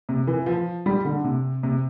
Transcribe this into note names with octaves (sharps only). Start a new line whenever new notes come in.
C3
E3
F3
G3
D3
C3
C3